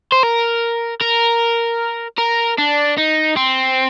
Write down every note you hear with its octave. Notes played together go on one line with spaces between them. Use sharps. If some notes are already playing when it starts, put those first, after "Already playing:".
C5
A#4
A#4
A#4
D4
D#4
C4